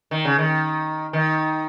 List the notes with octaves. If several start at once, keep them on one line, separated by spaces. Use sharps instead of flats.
D#3
C#3
D#3
D#3